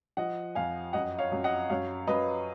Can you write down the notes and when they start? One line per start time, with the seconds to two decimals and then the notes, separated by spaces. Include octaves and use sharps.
0.17 F3 D#5 F#5
0.55 F2 F5 G#5
0.93 F#2 D#5 F#5
1.18 C#5 F5
1.32 F#2
1.44 D#5 F#5
1.69 F#2 C#5 F5
2.07 F#2 B4 D#5